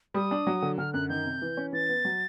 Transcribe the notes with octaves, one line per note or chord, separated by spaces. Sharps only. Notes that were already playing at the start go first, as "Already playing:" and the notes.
G3 D#6
D4
F#3
D3
D3 F6
F#2 F#6
D#3 G6
C3
E3
C#4
E3 A6
B3
F#3